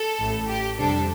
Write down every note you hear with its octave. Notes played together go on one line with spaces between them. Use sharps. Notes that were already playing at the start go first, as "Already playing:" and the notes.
Already playing: A4
A1 A2 A3
G4
F2 C3 G3 D4 A4